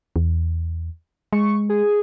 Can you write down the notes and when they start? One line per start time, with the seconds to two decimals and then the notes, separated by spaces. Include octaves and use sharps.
0.16 E2
1.33 G#3 C#6
1.69 G#4